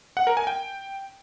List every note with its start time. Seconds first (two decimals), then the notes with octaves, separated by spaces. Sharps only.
0.17 F#5
0.27 A#4
0.37 G#5
0.47 G5